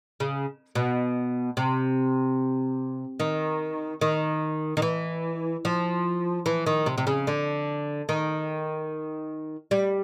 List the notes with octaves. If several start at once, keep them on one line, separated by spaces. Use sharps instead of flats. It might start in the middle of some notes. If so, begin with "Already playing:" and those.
C#3
B2
C3
D#3
D#3
D#3
E3
F3
E3
D#3
C3
C3
C#3
D3
D#3
G3